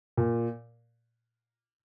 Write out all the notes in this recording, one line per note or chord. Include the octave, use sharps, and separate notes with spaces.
A#2